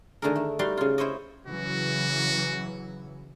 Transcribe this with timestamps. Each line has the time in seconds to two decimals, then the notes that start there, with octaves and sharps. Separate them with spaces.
0.22 D3 D#3 A3 G#4 A#4
0.35 A3
0.59 G3 D#4 F#4 F5 C6
0.77 C#3 F4
0.98 E4 C5 C#5 D#5
1.47 C#3 E3 F#3 F#4